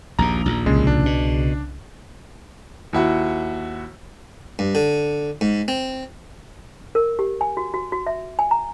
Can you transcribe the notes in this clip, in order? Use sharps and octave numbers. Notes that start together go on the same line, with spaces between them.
A#1 D#2 A#2 A#5
A#1 D#2
C2 C#3 G#3
D4
B2
D#2 E4 F#4
G2
D3
G#2
C4
A#4
G4
G#5
F#4
F#4
F#4
E5
G#5
A#5